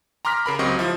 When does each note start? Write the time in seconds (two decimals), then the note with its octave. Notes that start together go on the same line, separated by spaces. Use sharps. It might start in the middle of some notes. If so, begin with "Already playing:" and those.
0.25 A#5 C6 D6 F6 A#6 B6
0.46 C#3 A#4 B5
0.59 C#2 F#3 C4 G4 D#5 C#6
0.79 F3 E4